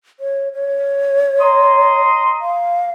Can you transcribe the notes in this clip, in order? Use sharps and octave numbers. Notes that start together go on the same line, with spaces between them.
C#5
C#5
D#5 A#5 C6
F5